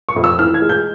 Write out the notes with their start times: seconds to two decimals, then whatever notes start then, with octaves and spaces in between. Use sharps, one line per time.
0.09 C#6
0.16 F2
0.24 E6
0.39 E3 F6
0.54 G#6
0.62 G#3
0.69 G6